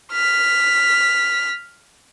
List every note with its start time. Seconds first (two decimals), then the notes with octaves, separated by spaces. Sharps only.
0.12 F6 B6